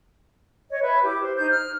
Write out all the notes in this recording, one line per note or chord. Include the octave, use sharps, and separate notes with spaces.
C#5 D#5
B4 E5 B5
E4 G4 D6
C5
D#4 C5 G6
F6